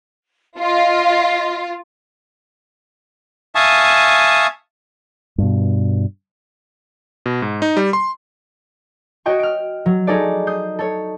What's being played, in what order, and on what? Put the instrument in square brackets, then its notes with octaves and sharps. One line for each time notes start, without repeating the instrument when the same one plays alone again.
[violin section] F4 [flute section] D#5 F5
[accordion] E5 F5 G#5 A5 C#6 D#6
[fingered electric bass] G2 B2
[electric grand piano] B2
G#2
D#4
G3
C6
[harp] F#4 C#5 D#5 G5 C#6
F6 D7
F#3
D#4 G#4 A4 C#5 D5
D#6 G6 C7
A4 C#5